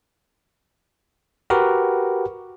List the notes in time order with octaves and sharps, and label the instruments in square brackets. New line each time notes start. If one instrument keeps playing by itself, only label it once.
[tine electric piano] F#4 G4 A#4 B4